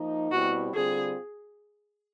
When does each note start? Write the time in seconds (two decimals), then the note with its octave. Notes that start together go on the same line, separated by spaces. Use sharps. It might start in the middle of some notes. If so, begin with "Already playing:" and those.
Already playing: F3 A#3 D#4
0.31 B2 G3 C4 E4 F#4 G4
0.74 D3 G3 C4 F4 G#4